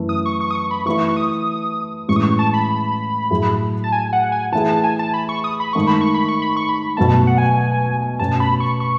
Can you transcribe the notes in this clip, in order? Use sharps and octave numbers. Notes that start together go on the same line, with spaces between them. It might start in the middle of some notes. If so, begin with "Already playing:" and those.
Already playing: F#2 E3 A3
D#6
C#6
C#6
D#6
C#6
B5
E3 A3 E4 C#6
C#6
D#6
A2 E3 G#3 C#4 C#6
D#6
C#6
A5
B5
A2 F#3 A3 E4 G#4
A5
G#5
F#5
G#5
E3 A3 E4 G#4 A5
A5
G#5
A5
B5
C#6
D#6
B5
G#2 D#3 A3 C#6
B5
C#6
B5
C#6
B5
C#6
B5
B2 F#3 A3 A5
F#5
G#5
B2 A3 C#4 F#4 A5
B5
C#6
C#6